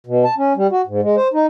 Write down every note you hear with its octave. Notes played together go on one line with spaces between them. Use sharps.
B2
A5
C#4
G3
F#4
G#2
G#3
C5
D#4